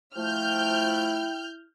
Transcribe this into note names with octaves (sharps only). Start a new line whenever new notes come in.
F3 A3 E4 G5 F6 G6